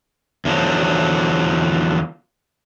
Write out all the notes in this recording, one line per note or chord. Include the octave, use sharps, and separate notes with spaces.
E2 D3 F3 F#3